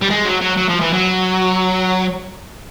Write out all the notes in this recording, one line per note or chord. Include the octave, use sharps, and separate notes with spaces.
G3
G#3
F#3
F#3
F#3
F3
E3
F#3